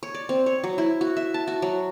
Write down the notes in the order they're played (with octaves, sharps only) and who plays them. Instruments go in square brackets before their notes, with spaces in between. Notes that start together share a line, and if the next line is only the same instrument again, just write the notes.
[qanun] C#5
D5
C4
C#5
F#3
E4
F#4
E5
A5
F#4
F#3